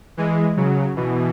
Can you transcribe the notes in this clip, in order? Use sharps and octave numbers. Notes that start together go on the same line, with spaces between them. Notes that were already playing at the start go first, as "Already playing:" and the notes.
E3 G#3
C#3 F#3
B2 E3